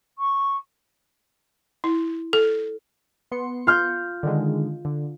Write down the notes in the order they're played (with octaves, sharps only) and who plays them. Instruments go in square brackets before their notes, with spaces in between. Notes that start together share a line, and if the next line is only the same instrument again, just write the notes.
[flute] C#6
[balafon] E4
A4
[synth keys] B3 C6 C#7
[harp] F4 F6 G6
[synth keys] D3 D#3 G#3
D3